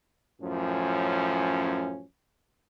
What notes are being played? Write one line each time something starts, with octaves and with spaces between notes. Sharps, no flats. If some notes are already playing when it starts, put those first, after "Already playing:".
F#2 A2 F3 C#4